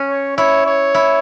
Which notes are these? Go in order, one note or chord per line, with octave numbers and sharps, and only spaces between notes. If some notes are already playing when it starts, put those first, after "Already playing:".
Already playing: C#4
C#5
E4 C#5
C#5
E4